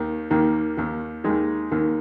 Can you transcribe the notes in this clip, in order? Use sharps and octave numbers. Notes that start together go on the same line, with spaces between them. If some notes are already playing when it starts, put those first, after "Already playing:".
Already playing: D#2 D#3
D#2 D#3 A#3
D#2 D#3
D#2 D#3 G#3
D#2 D#3